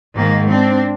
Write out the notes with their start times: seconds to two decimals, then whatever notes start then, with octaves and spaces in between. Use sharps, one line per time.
0.15 G#2 D#3 A#3
0.48 C4 D4